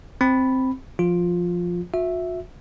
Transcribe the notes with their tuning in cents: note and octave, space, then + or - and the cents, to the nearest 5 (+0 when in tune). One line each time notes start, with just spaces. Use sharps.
C4 +0 B5 +0
F3 +0 F4 +10
F#4 -45 E5 +0